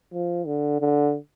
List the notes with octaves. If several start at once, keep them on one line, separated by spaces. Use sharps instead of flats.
F3
D3
D3